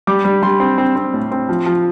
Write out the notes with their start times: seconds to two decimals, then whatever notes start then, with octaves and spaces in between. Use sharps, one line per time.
0.07 G3 D6
0.25 G3
0.42 G3 C6
0.60 C4
0.78 C4
0.96 C4
1.13 A2
1.31 C4
1.49 F3
1.66 F3